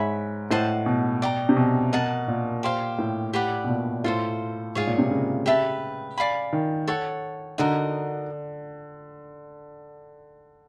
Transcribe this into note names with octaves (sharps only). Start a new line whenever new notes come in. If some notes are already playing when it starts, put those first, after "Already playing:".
Already playing: G#2 C#5 E5 G#5 B5
A2 C5 D#5 F#5 A5
B2
D5 G5 A#5
C3
B2
A#4 D#5 F#5 A5
A#2
G4 C5 F5
A2
G4 B4 D5 F#5
B2
A#2
A2 F4 A4 C5
G#2 F4 G#4 C#5
A#2
C3
C#3
G4 B4 E5 A5
D5 F5 G#5 B5
D#3
A4 C#5 F#5
D3 D#4 F#4 A#4 D#5